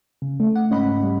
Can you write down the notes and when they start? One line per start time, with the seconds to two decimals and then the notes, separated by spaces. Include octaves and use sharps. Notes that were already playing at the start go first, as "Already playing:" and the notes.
0.22 C#3
0.40 A3
0.55 F#5
0.70 G#2 C#4 D#5 F#5 B5
1.00 G3 C#4